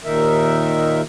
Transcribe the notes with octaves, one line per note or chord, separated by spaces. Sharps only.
D#2 A#2 D#3 D#4 A#4 E5